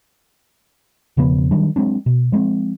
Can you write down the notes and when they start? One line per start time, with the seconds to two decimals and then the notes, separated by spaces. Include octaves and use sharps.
1.17 E1 C#3 F3 B3
1.51 D#3 F#3 G3 D4
1.76 F#3 G#3 C4 D4
2.06 B2
2.32 F3 G#3 A#3 C4